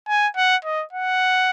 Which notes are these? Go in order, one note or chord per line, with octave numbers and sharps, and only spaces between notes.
G#5
F#5
D#5
F#5